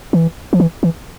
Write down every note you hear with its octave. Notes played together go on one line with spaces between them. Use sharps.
E3
F3
E3
E3